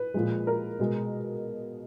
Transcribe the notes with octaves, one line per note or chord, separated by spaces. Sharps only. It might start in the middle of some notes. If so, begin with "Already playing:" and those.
Already playing: B4
A#2 F3 G#3
A#4
B2 G#3